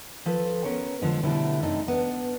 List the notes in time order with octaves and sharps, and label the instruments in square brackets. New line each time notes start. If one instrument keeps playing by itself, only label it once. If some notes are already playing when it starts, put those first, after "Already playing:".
[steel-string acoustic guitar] F3 A4 B4
B3 C#4 A#4 C#5
D3 F3 G#3
B2 D3 F#3 G3 A3 E4
F#2 C3 A3 D4 D#4
B3 D4